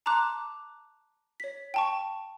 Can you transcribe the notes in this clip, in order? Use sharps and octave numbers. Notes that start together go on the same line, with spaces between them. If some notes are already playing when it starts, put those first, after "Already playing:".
A5 A#5 C6 D6 F#6
C#5 B6
G5 A5 C#6